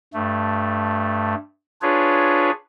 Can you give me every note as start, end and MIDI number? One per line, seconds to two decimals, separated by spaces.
0.14 1.35 43
0.14 1.35 57
1.82 2.51 62
1.82 2.51 65
1.82 2.51 68
1.82 2.51 71
1.82 2.51 73